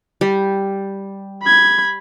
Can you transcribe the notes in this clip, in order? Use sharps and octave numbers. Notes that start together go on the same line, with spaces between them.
G3
B5 G#6